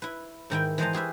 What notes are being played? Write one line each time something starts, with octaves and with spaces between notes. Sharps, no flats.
E4 B4
G#2 D#3 E4 G5
E3 G#3 C5 D#5 A5 A#5
G4 G#4 B4 E5